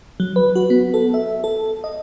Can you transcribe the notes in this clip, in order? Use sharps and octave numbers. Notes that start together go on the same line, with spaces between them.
F#3
B4
F#4
B3
A4
E5
A4
D#5